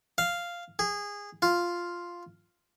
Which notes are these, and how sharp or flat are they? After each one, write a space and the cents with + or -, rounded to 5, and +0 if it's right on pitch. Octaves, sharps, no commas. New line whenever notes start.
F5 -5
G#4 -20
F4 +0